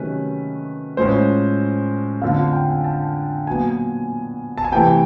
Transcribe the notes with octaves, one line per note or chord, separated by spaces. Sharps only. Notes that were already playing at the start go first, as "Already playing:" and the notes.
Already playing: C3 D#3 F#3 A3 C#4 B4
A2 F3 G#3 C#4 C5
F2 D3 F3 A3 F5
G5
G#5
A5
A#2 F#3 B3 G#5
A5
G#5
C3 E3 A3 G5